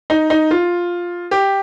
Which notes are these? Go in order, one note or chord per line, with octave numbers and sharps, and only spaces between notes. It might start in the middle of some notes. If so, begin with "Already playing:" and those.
D#4
D#4
F4
G4